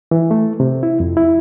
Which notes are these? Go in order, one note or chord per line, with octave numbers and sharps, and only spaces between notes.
E3
A3
C3
E4
F2
E4